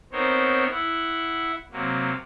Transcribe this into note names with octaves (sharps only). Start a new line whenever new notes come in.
B3 C4 D#4 A#4 C5 C#5
E4 F#5
C3 F#3 A#3